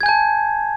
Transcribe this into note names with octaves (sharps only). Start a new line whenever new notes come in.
G#5 A5 G6 G#6